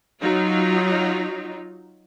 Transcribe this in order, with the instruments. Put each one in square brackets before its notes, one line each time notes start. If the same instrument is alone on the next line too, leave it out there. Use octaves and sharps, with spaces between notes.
[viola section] F#3 D#4 F4